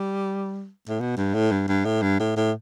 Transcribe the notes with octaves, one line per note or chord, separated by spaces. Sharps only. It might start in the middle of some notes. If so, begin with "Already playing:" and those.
Already playing: G3
A2
B2
G2
A2
G2
G2
A2
G2
A2
A2